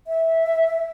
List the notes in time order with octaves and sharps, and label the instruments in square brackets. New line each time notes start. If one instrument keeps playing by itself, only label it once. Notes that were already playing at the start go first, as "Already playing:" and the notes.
[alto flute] E5